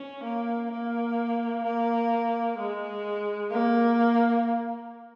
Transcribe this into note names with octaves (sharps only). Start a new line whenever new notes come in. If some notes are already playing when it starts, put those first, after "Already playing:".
Already playing: C#4
A#3
A#3
A#3
G#3
A#3